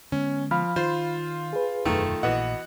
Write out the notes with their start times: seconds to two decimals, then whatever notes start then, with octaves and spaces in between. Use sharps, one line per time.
0.12 D3 G#3 B3 C#4
0.51 F3 F5 B5 F6
0.76 D#3 F4 C5
1.53 G#4 B4
1.85 E1 F#2 D#3 A3
2.23 A#1 A#2 E3 B3 F#4 D#5 F#5